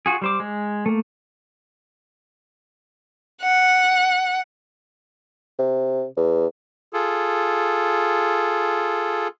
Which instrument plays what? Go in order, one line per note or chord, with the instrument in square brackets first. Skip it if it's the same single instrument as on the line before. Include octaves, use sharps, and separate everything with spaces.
[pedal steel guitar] F4 F#4 G#4
G3 C5 D6
G#3
A3 A#3
[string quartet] F#5
[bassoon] C3
E2
[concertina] F4 G#4 A4